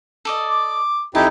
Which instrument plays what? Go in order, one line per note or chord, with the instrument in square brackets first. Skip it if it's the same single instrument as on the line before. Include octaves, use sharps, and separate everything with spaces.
[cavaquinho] A4 D5 D#5
[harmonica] D6
[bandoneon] F2 D#4 E4 [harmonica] G4 [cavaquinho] A5